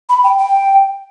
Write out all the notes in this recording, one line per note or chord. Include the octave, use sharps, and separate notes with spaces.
B5
G5
G5